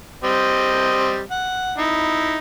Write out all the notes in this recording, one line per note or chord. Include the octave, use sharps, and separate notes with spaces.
G3 C4 D#5
F#5
D#4 E4